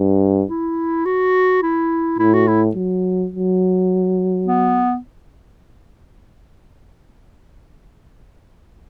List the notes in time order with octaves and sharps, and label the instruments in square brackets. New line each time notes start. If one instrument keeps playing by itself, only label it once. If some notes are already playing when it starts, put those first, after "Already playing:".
Already playing: [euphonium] G2
[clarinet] E4
F#4
E4
[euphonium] A2 [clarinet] E4
[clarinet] F#4
E4
[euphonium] F#3
F#3
[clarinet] B3